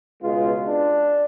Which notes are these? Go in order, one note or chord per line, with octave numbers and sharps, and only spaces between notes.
C#2 B2 G#3 B3 F4
D4